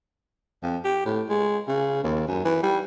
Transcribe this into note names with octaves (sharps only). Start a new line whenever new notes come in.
F2
G4
A2
G#3
C#3
D#2
F#2
E3
G3